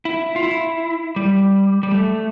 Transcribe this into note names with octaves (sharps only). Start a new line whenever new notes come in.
E4
F4
E4
G3
G3
A3